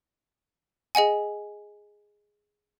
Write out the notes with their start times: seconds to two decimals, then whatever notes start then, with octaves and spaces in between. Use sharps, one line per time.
0.95 G#4 D#5 F#5 G#5